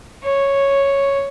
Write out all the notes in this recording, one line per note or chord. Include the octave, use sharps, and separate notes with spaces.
C#5